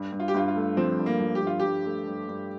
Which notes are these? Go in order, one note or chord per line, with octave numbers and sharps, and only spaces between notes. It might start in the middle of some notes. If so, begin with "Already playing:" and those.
Already playing: G2
G2
F4
G4
G2 F4
F4
A3
F3 C4
G2
A#3
F3
G4
G2
F4
G2 G4
A3
G2
G2